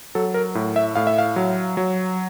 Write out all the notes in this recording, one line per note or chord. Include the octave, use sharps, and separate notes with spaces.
F#3 A4
A#4
A2
E5
A2 F5
E5
F5
F#3
F#3